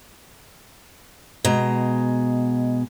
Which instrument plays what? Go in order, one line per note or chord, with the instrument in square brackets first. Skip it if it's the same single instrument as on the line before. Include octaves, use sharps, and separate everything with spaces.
[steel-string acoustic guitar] B2 G#3 A#5